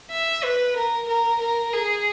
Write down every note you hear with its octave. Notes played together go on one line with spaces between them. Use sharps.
E5
B4
A#4
A#4
A#4
G#4